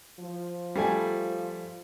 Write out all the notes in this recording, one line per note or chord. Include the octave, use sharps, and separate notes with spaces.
F3
G3 A3 G#5